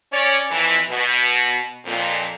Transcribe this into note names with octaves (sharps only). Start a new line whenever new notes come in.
C#4 C#5 D5
F2 E3
B2
F2 A#2